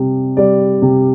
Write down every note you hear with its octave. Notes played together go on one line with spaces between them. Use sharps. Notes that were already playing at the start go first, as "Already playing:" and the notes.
Already playing: C3 G3
G3 D5
C3